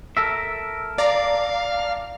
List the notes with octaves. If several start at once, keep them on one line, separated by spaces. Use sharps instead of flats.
A4 A#4 E5
D5 F5 A#5